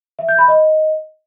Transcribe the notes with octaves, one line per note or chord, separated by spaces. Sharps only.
E5
G6
B5
D#5